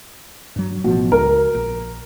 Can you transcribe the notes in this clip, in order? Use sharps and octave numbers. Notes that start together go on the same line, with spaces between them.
G2 F#3
A1 B2 F3
C#2 A#4
A#1